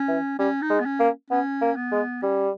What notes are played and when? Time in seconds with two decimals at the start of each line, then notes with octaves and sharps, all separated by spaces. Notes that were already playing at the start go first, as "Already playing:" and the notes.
Already playing: C#4
0.08 E3
0.39 G3 C#4
0.62 D#4
0.70 G#3
0.80 B3
0.85 C#4
1.00 A#3
1.31 B3 C#4
1.62 A#3
1.76 B3
1.92 G#3
2.23 G3 C#4